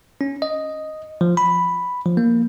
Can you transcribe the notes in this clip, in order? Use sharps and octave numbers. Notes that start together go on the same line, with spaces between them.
C#4
D#5
F3
B5
F3
A#3